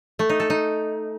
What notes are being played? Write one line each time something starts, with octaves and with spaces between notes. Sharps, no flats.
A3
D#4
A4
D#4